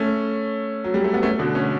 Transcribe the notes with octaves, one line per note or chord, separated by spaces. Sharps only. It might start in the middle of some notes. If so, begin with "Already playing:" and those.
Already playing: A3 C#4
F#3
G3
A3
B3
A3 C#4
B2 D3
A3 C#4